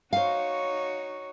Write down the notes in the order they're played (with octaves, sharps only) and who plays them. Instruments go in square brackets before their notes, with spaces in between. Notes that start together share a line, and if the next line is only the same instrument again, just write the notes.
[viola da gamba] D#4 F#4 C#5 [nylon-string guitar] C5 F5